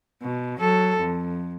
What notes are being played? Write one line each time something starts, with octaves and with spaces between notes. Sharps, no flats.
B2
F#3 A4
F2